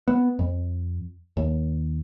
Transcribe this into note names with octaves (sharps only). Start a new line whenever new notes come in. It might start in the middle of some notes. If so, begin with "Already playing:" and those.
B3
F2
D#2